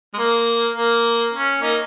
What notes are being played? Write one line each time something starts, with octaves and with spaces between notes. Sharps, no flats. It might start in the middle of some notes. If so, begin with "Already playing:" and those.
G#3
A#3
A#3
C#4
A#3 D#4